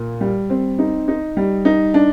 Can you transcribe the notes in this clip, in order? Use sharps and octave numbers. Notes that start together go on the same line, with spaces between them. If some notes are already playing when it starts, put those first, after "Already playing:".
Already playing: A#2
G3
C4
D#4
D#4
G3
D#4
D4